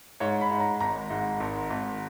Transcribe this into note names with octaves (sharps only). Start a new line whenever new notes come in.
G#2 C#5
B5
G#2
A#5
G#1 A#5
G#2
G#1
G#1